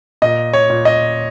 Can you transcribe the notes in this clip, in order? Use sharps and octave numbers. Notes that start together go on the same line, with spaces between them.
A#2 D#5
C#5
A#2
D#5